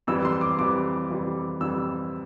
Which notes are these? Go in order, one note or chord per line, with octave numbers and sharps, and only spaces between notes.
F2 E3 G3 E6
C6
D6
F2 E3 G3 D6
F2 E3 G3
F2 E3 G3 E6